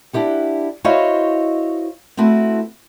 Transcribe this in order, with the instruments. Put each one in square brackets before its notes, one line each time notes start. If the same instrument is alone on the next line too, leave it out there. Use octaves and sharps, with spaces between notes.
[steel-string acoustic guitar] D4 E4 G4 F#5
E4 F#4 C5 C#5 D#5 F5
A3 C4 E4 F#4 B4